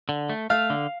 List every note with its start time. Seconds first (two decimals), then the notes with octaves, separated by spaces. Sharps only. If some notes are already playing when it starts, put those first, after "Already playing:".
0.09 D3
0.29 A3
0.50 A3 F5
0.70 D3